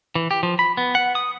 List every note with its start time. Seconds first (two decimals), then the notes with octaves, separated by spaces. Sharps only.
0.15 E3
0.31 G4
0.43 F3
0.59 B5
0.77 B3
0.95 F#5
1.15 D#6